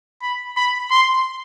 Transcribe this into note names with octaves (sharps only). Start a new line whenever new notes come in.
B5
B5
C6